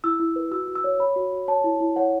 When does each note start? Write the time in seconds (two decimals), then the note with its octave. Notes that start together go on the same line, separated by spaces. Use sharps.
0.04 E4 E6
0.20 E4
0.36 B4
0.51 F#4 E6
0.67 F#4
0.75 E6
0.84 C#5
0.99 C#5 B5
1.16 F#4
1.32 F#4
1.48 C#5 A5
1.64 E4
1.80 E4
1.96 C#5 F#5